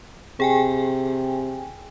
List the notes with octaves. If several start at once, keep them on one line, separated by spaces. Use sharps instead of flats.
C3 G#4 G5 G#5